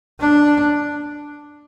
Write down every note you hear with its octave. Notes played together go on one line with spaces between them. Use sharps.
D4